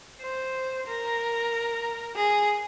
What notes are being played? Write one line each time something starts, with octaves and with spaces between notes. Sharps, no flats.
C5
A#4
G#4